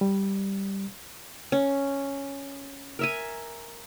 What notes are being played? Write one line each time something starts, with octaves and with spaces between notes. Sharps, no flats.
G3
C#4
A#4 E5 G#5